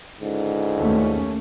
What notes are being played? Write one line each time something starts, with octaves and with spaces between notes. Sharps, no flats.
C#2 G#2 D3
D#2 A3 C#4